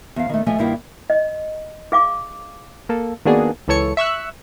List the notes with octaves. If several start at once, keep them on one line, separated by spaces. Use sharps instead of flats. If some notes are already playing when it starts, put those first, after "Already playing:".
E2 F5
D#3 A3
E3 F3 A3 D#5 E5 G#5
G2 D#3 A#3 E4 F4 G5
D#5
G#4 F5 D6
A#3 A4
D#3 A#3 B3 D4 F#4 G#4
C#2 E3 A4 C#5 C#7
E5 C#6 E6 F#6